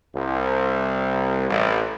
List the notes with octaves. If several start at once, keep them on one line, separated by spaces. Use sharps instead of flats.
C2
A1